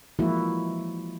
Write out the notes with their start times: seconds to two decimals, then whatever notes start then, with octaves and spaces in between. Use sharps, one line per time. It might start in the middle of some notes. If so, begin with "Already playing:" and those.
0.19 E3 F3 G#3 A#3 E4 F#4